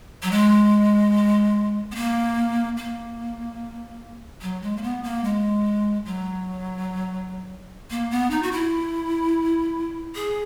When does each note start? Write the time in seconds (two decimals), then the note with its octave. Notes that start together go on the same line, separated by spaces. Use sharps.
0.23 F#3
0.31 G#3
1.92 B3
1.95 A#3
2.77 A#3
4.42 F#3
4.62 G#3
4.77 A#3
4.83 B3
5.03 A#3
5.24 G#3
6.05 F#3
7.90 A#3
8.11 B3
8.31 D#4
8.43 F#4
8.52 E4
10.15 G#4